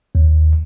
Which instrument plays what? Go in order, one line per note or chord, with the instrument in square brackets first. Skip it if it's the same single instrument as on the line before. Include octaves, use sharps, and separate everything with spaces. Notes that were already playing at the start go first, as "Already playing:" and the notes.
[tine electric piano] D#2